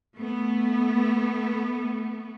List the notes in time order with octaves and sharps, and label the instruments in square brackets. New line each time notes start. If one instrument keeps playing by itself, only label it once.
[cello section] A3 B3